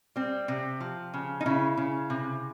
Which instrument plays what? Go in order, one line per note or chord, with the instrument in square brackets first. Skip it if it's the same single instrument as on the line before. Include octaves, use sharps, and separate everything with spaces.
[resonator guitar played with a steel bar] G3 C4
C3
F3
C#3
D#4
C#3 E4
C#3
C3